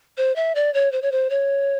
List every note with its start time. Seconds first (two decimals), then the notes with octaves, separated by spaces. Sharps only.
0.17 C5
0.36 E5
0.55 D5
0.74 C#5
0.92 C5
1.02 C#5
1.12 C5
1.30 C#5